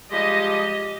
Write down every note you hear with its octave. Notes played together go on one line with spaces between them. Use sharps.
F3 G3 G#3 G4 D#5